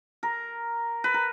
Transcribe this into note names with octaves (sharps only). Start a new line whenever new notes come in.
A#4
B4
A#4